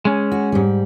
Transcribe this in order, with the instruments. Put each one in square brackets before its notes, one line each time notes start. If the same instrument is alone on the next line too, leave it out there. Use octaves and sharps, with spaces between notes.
[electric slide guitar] G#3 C#4
[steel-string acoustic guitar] F#4
G#2 G3